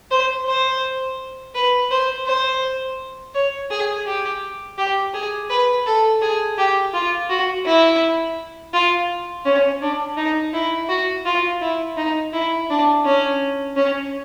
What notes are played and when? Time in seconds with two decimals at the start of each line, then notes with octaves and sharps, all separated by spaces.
0.11 C5
0.47 C5
1.54 B4
1.91 C5
2.26 C5
3.34 C#5
3.70 G#4
4.06 G4
4.78 G4
5.14 G#4
5.50 B4
5.86 A4
6.22 G#4
6.58 G4
6.94 F4
7.29 F#4
7.66 E4
8.74 F4
9.45 C#4
9.81 D4
10.17 D#4
10.53 E4
10.89 F#4
11.25 F4
11.61 E4
11.97 D#4
12.33 E4
12.69 D4
13.05 C#4
13.76 C#4